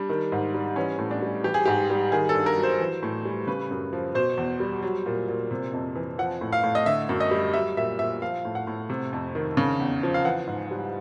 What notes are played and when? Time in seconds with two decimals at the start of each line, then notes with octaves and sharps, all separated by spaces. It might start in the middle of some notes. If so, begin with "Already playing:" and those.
Already playing: G3 D4
0.09 D#3
0.32 G#2
0.54 G3
0.76 E3 C#4
0.99 A2
1.11 D4
1.22 G3
1.44 E3 G4
1.54 G#4
1.66 G#2 G4
1.90 G3
2.12 D#3 G#4
2.29 A4
2.34 G2
2.46 A#4
2.57 F#3
2.63 C5
2.80 E3
3.03 A2
3.25 G3
3.47 C#3 B4
3.71 F#2
3.93 F3
4.15 B2 C5
4.37 E2
4.60 G3
4.83 F#3
5.06 A#2
5.28 A#2
5.51 C3
5.73 F2
5.96 E3
6.18 F3 F#5
6.41 A2
6.53 F5
6.64 A2
6.75 D#5
6.86 D3 E5
7.09 F#2
7.20 D#5
7.31 G3
7.54 F#3 E5
7.77 A#2 E5
7.99 A#2 E5
8.22 F3 F5
8.45 A2
8.55 F#5
8.67 A2
8.90 C3
9.13 F2
9.35 D#3
9.57 C#3
9.80 E2
10.03 F3
10.14 F5
10.25 E3 F#5
10.47 G#2
10.71 G3